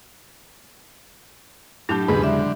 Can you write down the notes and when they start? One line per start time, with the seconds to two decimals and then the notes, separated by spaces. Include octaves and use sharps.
1.89 A2 F#3 D4 G4 A5 G6
2.08 E1 G#2 C#3 G3 G#3 B4
2.23 D3 E5